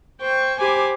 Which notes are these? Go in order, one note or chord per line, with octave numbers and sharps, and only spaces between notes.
C5 G5 C#6
G4 C5 G#5 B5 D6